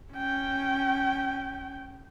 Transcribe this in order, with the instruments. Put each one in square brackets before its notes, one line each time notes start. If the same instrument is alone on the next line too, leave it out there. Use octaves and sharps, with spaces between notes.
[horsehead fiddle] C#4 G5